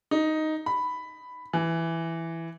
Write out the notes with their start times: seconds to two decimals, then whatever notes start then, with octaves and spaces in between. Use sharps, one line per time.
0.11 D#4
0.66 B5
1.53 E3